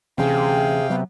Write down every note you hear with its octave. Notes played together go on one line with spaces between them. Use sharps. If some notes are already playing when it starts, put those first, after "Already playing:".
D2 C3 E3 C#4 G#4 F5 G5
F#3 B3